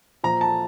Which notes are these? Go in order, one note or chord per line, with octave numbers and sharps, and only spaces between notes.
A#2 F3 A#5
A5